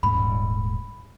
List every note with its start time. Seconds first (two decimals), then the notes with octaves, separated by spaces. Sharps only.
0.03 D#1 G#2 B5